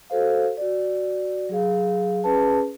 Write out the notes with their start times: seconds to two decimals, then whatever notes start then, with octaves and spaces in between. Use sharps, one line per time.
0.10 F#4 A4 C5 F5
0.57 F#4 D5
1.49 F#3 G#4 F5
2.24 C#4 G#4 B4 A5